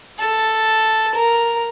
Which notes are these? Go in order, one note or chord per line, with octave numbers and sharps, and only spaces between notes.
A4
A#4